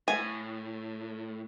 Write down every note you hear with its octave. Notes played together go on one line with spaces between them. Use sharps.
A2 G#5